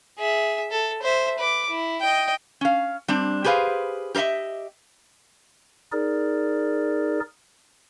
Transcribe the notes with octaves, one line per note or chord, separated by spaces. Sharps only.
G#4 E5
A4
C5 E5
B4 D6
E4
D#5 G5
C#4 F5
G3 C4 D4
G4 G#4 B4 C5 F5
G4 A#4 C5 D#5 E5
D#4 G#4 A#4 D5